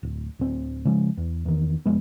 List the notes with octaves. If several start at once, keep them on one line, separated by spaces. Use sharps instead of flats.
D1
D1 C4
C#3 F3 G#3
E2
E2 D#3
F1 F3 G#3 B3